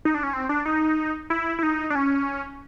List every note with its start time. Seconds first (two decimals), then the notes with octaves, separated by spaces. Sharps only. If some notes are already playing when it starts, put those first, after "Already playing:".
0.05 D#4
0.15 D4
0.23 C#4
0.33 C4
0.49 D4
0.66 D#4
1.30 E4
1.59 E4
1.63 D#4
1.90 D4
1.95 C#4